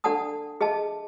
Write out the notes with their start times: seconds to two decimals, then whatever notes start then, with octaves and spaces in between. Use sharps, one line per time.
0.04 D4 A4 D5 F#5 A5 D#6
0.61 G#4 D#5 E5 A5